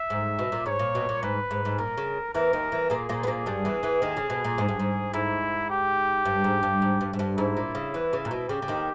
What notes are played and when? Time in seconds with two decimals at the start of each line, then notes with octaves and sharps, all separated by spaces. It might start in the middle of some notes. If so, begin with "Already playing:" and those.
Already playing: E5
0.10 G#2
0.39 B2
0.52 A#2
0.66 G#2 C#5
0.79 A#2
0.95 B2
1.09 A#2
1.23 G#2 B4
1.51 G#2
1.65 G#2
1.78 A#2 A#4
1.97 C#3
2.34 E2 E3 A#4
2.53 D#2 D#3
2.72 E2 E3
2.90 A#2 A#3 G#4
3.09 A#2 A#3
3.23 B3
3.27 A#2 A#3
3.46 G2 G3
3.65 E2 E3
3.83 E2 E3
4.02 D#2 D#3
4.17 C#3
4.30 B2
4.44 A#2
4.58 G#2
4.68 G2
4.79 G#2
5.14 G#2 E4
5.70 G4
6.25 G2
6.44 G#2
6.63 G2
6.82 G#2
7.01 G2
7.13 G#2
7.19 G2
7.38 G#2 E4
7.57 A#2
7.75 C#3
7.94 E2 E3
8.13 C#3
8.25 A#2
8.31 B2
8.49 C#3 G4
8.62 C#3
8.68 D#2 D#3